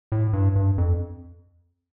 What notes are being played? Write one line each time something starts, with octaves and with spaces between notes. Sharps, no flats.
A2
G2
G2
F2